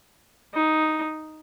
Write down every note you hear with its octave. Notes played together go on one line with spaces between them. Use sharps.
D#4